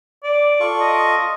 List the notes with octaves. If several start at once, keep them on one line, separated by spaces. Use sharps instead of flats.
D5
F4 A4 C#6
D#5